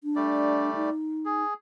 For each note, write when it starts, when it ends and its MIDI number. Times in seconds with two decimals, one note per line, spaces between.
0.04 0.73 62
0.16 0.90 55
0.16 0.90 57
0.16 0.90 74
0.75 1.44 63
1.25 1.54 68